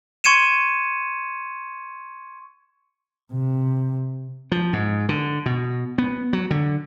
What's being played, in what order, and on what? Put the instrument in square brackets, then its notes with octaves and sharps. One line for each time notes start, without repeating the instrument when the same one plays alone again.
[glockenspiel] C6 C#6 G#6 C#7 D#7 E7
[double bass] C3
[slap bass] F3
G#2
D3
B2
B3
F#3
D3